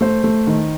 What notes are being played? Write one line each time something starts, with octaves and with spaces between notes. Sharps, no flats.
A3 C5
A3
D#3